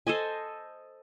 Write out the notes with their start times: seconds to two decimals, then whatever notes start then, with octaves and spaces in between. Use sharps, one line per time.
0.07 A4 C5 D#5 G#5